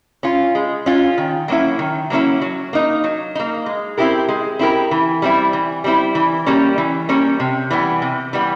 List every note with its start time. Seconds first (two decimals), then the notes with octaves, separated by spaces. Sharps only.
0.23 C#4 F4
0.55 G#3
0.86 C#4 F4
1.18 D#3
1.48 F#3 A#3 C#4 E4
1.79 D#3
2.10 F#3 A#3 C#4 E4
2.41 F#3
2.73 A#3 D#4
3.04 F#3
3.35 A#3 D#4
3.66 G#3
3.98 C4 E4 G4 A#4
4.28 G#3
4.59 C4 E4 G4 A#4
4.91 E3
5.22 G3 C4 E4
5.53 E3
5.84 G3 C4 E4
6.15 E3
6.46 G3 A#3 C#4
6.78 E3
7.09 G3 A#3 C#4
7.40 C3
7.71 E3 G3 B3
8.02 C3
8.33 E3 G3 B3